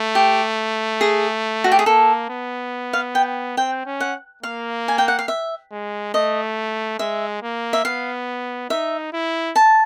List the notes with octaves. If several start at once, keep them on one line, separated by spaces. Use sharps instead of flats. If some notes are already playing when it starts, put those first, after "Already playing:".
Already playing: A3
G4
G#4
F#4
G4
G#4
A#3 A4
B3
F5
G5
C4 G5
C#4
F#5
A#3 F5
G#5
G5
F#5
F5
E5
G#3
A3 D#5
G#3 E5
A#3
E5
B3 F5
D#4 E5
E4
A5